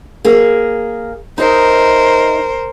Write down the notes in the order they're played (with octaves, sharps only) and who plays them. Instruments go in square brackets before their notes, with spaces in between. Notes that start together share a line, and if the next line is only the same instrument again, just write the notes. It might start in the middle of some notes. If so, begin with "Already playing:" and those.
[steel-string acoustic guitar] A#3 G#4
[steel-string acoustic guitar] D#4 D#5 E5 [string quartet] A#4 C5